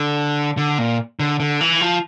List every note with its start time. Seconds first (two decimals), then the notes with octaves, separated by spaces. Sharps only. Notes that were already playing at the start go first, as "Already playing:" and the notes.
Already playing: D3
0.57 D3
0.79 A#2
1.20 D3
1.40 D3
1.61 E3
1.81 F3